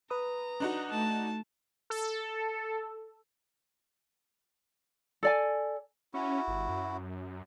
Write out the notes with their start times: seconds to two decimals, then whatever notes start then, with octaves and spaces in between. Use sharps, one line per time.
0.10 B4 A#5 D#6
0.60 D4 D#4 F#4
0.90 A3 A5
1.90 A4
5.23 A4 D5 G#5
6.14 C#4 E4 F#4
6.48 G1
6.69 F#2